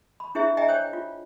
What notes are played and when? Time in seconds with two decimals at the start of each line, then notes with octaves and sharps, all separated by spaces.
0.20 B5
0.35 D4 E4 G#4 C5 E5
0.57 D#5 E5 G5 G#5 A#5
0.69 C5 C#5 G5
0.93 F4